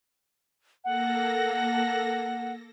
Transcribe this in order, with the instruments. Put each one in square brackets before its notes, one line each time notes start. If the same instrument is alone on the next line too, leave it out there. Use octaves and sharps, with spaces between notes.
[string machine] A#3 A4 A#6 [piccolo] F#5